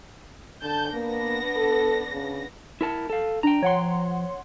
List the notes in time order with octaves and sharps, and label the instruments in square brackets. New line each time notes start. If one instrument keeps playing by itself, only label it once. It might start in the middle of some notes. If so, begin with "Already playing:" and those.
[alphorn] D3 [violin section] A5 G6
[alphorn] A#3 [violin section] B3 D4 A#6
[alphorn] A4
C#3
[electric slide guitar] E4 A#4 A5
A4 F5
[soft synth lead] D4 [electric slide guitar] G5 A#5
[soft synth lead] F3 [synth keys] C#5 F#5 C6